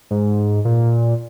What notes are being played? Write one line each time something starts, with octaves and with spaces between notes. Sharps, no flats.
G#2
A#2